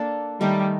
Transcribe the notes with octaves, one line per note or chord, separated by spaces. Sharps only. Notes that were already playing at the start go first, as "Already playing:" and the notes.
Already playing: A#3 D4 A4
D#3 G3 A3 D#4 A#4